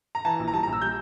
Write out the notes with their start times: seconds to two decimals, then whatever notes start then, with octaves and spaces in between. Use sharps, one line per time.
0.15 A#5
0.25 E3 A5
0.40 A#1
0.48 A#5
0.54 G3 A5
0.63 A#5
0.67 A#1
0.73 E6
0.82 G3 G6